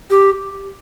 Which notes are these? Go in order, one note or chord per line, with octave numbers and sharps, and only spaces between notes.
G4